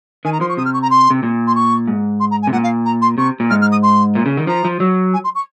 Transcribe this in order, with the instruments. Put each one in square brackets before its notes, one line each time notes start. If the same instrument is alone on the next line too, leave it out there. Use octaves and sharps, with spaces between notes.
[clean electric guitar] D#3 [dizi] G#5
[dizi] A#5
[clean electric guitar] F3 [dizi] C6
[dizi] C#6
[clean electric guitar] C3 [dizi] D#6
[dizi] F6
C#6
A#5
C6
[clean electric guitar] C3
A#2
[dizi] C6
C#6
[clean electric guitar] G#2
[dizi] C6
A#5
G#5
[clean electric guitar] C3
[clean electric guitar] A#2 [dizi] F#5
[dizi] F5
A#5
C6
[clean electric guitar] C3 [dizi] C#6
[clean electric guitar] A#2
[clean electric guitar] G#2 [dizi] F6
[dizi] F6
D#6
C6
[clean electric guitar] A#2
C#3
D#3
[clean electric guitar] F3 [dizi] A#5
[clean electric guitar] F3
F#3
[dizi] G#5
C6
C#6